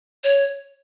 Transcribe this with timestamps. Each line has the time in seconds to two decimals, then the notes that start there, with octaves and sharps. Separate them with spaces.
0.24 C#5